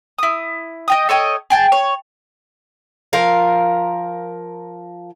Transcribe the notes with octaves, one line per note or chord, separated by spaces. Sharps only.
E4 D#6
D#5 G5 D#6
A4 C#5 D#5 G5
G#4 G5 A5
C#5
F3 A#4 F5